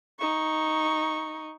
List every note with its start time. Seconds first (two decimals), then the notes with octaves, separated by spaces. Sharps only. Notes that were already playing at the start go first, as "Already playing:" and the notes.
0.19 D#4 C#6